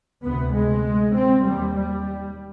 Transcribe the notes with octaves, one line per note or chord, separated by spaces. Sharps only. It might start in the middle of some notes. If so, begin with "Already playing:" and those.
D2 C3 B3
G#3
C4
D#2 G3
G3